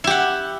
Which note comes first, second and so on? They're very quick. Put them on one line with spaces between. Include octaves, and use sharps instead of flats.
E4 G4 F#5